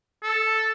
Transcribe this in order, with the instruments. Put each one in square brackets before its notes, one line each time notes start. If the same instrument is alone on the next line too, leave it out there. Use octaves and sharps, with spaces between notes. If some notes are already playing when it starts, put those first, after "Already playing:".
[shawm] A4